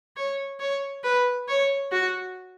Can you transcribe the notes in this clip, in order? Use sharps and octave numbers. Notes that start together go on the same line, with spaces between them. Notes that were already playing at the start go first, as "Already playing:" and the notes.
C#5
C#5
B4
C#5
F#4